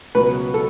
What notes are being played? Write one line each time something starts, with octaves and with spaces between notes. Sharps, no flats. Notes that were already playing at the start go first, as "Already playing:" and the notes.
C#2 B2 F#3 B4
A4